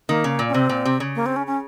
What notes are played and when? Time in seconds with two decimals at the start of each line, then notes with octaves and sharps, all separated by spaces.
0.09 D#3 A#3
0.24 C#3
0.39 A#2
0.48 C#4
0.54 C3 C4
0.69 A#2
0.85 C3
1.00 C#3
1.15 A#3
1.26 C4
1.36 C#4
1.47 C#4